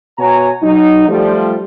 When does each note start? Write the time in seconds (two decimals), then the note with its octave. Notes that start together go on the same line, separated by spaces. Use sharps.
0.18 B2 F#4 C#5 G#5 A#5
0.62 F#3 D#4
1.09 F3 G3 A3